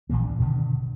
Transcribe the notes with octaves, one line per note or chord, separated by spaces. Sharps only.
A#1 A#2 E3 A#3
D2 D4
G2 B2 D3 D#3